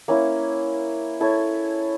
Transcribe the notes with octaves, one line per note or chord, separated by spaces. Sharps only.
A#3 C#4 E4
E4 A4 C#5